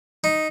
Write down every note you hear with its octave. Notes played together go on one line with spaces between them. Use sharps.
D#4